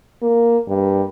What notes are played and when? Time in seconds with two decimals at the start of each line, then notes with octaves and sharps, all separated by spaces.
0.22 A#3
0.68 G2